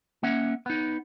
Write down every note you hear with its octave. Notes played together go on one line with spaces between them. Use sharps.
A#3 C#4 E5 F#5
B3 D#4